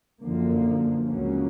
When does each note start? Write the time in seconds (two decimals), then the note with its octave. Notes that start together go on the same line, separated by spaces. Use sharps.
0.22 F#2 D3 F3 A#3
1.06 C#2 C#3 F#3 A#3 C#4